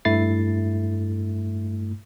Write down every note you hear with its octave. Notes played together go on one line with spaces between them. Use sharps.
G2 A3 E4 A6 C7